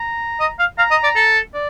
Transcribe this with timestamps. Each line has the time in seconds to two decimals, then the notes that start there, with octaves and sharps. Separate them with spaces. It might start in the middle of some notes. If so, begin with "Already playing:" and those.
Already playing: A#5
0.40 D#5
0.59 F5
0.78 F5 A#5
0.91 D#5
1.04 D5
1.16 A4
1.54 D5